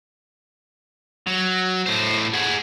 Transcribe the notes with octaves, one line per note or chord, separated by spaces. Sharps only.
F#3
A2 C5
G#4 F#5